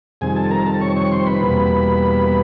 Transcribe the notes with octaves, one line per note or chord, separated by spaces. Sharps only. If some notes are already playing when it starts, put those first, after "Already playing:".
F2 C3 D#3 G3 C4 G#4 G#5
A4 A5
A#4 A#5
A4 A5
C#5 C#6
C#5 C#6
C5 C6
B4 B5
E2 B2 G3 A#3